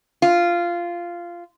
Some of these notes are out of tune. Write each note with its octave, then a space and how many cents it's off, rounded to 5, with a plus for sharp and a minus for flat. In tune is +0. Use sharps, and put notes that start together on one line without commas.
F4 -10